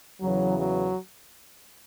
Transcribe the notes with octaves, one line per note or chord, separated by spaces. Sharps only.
E2 C#3 E3 F#3
F#3